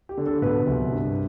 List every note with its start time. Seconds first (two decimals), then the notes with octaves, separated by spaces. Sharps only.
0.09 G4
0.17 D3
0.26 A4
0.42 B2 B4
0.67 C2
0.92 G2